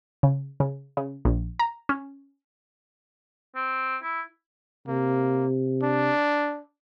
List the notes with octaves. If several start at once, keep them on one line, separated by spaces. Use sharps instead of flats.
C#3
C#3
C#3
A#1
A#5
C#4
C4
E4
C3 A#3
D4